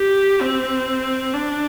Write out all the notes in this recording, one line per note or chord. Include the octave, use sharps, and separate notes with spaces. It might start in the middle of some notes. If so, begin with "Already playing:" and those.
Already playing: G4
C4
D4